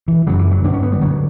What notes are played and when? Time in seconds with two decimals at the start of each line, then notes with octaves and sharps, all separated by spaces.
0.08 E3
0.27 F#2 C#3 F#3
0.39 E3
0.51 F#3
0.64 G2 D3 D4
0.73 C#4
0.83 B3
0.92 G3
1.01 G2 D3 F#3